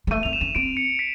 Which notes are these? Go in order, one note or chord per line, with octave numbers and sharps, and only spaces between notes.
G#3
A3 D#7
C4 F7
E7
C#4
C4 D7
C#7
B6